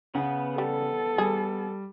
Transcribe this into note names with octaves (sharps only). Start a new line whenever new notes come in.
C#3 B3 F#5
G3 A4
G3 G#4